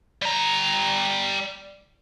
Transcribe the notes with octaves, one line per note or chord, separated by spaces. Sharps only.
G3 A#5